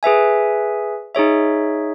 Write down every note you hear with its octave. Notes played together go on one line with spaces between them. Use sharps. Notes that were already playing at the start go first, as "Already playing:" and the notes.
G#4 B4 E5 G#5
D#4 G#4 C#5 E5